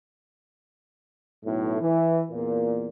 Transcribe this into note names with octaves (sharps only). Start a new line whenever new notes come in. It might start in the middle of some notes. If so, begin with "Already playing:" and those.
B1 A2
E3
E2 A#2